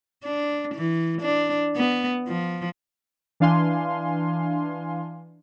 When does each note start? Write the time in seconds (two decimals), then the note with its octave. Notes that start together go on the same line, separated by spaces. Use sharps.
0.24 D4
0.75 E3
1.22 D4
1.76 B3
2.28 F3
3.40 E3 D4 F5 G#5 C6